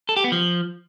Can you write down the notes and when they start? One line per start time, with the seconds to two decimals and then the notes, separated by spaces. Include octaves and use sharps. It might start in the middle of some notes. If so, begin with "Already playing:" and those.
0.09 A4
0.17 G4
0.24 B3
0.32 F3